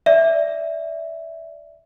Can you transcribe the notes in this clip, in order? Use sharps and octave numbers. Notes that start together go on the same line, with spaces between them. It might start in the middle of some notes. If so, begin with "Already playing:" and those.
D5 E5